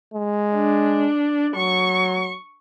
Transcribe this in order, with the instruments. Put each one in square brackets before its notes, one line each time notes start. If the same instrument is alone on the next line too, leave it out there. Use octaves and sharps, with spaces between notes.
[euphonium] G#3
[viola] D4
[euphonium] F#3 [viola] C#6